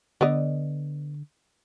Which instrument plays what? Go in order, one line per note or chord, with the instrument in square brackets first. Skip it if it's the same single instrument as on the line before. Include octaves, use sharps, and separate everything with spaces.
[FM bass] D3 [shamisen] B3 D5 D#5